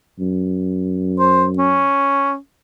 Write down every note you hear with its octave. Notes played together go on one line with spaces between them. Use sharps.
F#2
C5
C#4